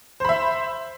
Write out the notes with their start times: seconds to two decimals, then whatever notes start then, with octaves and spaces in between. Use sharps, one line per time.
0.20 C5
0.25 B5
0.29 E5